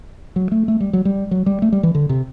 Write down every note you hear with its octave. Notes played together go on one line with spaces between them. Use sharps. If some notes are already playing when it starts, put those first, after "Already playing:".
F#3
A3
A3
G3
F#3
G3
F#3
G3
A3
G3
E3
D3
C3